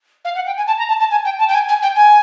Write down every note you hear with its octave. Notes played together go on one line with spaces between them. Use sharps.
F5
F#5
G5
G#5
A5
A#5
A5
A5
G#5
G5
A5
G5
G#5
G#5
G5
G#5